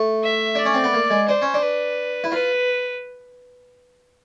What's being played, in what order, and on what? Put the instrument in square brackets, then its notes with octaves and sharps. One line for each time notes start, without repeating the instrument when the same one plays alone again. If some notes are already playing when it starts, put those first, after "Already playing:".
Already playing: [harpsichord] A3
[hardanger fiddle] E5
[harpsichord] D4 [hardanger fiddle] D5
[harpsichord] C#4
C4
B3
A#3
G#3
[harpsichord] D4 [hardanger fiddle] C5
[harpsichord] C#4
D4
[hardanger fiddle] B4
[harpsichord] E4
[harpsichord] F4 [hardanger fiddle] B4